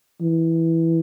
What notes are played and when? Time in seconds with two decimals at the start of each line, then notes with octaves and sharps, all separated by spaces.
0.21 E3